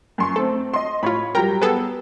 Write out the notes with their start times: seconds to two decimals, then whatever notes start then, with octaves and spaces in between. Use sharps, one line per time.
0.18 F#2 C6 C#6
0.36 A3 C4 A4
0.74 D#5 C6
1.03 A2 F4 C#5 B5
1.35 F#3 G3 A#4 G5 A#5
1.61 B3 G#4 A4